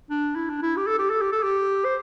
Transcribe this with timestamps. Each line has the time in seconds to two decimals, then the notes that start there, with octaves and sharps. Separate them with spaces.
0.10 D4
0.36 E4
0.50 D4
0.62 E4
0.77 G4
0.87 A4
0.99 G4
1.10 A4
1.22 G4
1.32 A4
1.43 G4
1.85 C5